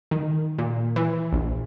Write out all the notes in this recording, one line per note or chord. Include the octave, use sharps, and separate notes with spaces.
D#3
A#2
E3
A#1